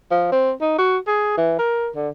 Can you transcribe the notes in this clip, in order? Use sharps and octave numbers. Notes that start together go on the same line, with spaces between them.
F3
C4
D#4
F#4
G#4
E3
A#4
D3